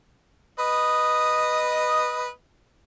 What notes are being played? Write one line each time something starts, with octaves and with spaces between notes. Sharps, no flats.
B4 D#5 D#6